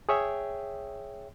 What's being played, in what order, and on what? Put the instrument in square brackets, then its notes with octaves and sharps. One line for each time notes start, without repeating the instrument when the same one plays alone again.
[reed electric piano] G#4 C#5 E5 G5